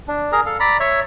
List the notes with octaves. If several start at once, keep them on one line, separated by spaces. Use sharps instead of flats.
D4
G#4 A#4 A#5
A4 F5
D5 A#5 B5
C#5 E5